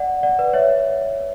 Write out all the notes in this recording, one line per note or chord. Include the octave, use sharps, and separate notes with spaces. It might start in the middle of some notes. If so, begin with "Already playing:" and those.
Already playing: D5 F#5
D5 F#5
B4 D5
C#5 E5